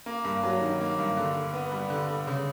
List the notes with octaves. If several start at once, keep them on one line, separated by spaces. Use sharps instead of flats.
A#3
G2
F#3
D#3
A#3
G2
D3
D3
B3
G3
D3
D3
C#3